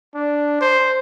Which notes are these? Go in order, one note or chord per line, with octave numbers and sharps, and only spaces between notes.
D4
C5